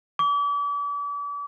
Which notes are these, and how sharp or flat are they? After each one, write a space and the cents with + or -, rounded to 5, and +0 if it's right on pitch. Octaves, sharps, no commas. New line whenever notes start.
D6 -40